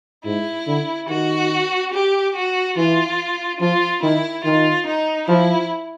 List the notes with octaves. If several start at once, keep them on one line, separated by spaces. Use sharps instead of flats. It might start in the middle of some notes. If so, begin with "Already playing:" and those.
G#2 E4
D3
D#3 F#4
G4
F#4
E3 F4
F3 F4
D#3 E4
D#3 F4
D#4
F3 E4